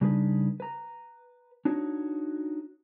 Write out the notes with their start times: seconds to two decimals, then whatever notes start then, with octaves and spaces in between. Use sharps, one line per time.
0.01 C#3 G3 D4 D#4 G#4 B4
0.60 B4 A#5
1.65 D4 D#4 F#4 C#5